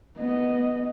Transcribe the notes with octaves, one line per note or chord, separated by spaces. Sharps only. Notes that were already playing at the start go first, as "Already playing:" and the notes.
B3 D#5